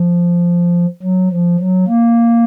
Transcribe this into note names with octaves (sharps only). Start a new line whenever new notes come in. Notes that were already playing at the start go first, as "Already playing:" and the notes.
Already playing: F3
F#3
F3
F#3
A#3